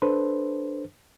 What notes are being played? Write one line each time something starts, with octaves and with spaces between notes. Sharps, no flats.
D4 A4 B4 C5